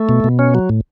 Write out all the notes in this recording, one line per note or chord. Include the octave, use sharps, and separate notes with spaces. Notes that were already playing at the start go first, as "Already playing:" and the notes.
Already playing: A3
B2
B2
C#4
F#3
A2